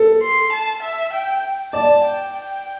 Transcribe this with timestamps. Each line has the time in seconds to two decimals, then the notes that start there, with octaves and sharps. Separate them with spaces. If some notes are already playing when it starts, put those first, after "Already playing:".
Already playing: A4
0.22 C6
0.52 A5
0.82 E5
1.13 G5
1.73 D5 A5
2.04 G5
2.34 G5